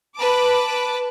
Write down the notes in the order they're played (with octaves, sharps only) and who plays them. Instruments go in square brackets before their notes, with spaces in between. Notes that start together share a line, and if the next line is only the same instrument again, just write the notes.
[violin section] B4 A5 D6